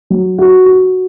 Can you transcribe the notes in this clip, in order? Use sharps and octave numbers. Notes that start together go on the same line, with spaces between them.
F#3
F#4
F#4